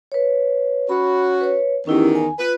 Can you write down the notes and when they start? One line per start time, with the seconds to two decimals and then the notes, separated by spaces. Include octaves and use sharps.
0.12 B4 C#5
0.89 C#4 F#4 B5
1.41 B4 C#5
1.87 E2 D#3 C#4 E4 G4
2.15 G#5
2.39 F4 B4